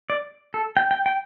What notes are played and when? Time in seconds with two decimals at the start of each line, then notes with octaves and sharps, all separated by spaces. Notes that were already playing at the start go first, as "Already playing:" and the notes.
0.10 D5
0.54 A4
0.77 G5
0.91 G5
1.06 G5